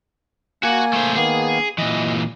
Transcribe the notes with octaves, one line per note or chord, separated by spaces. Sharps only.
A#3 F#4 F#5 G#5
A3 C5
D#3 A#3 B3 G#4
A#2 E3 D#5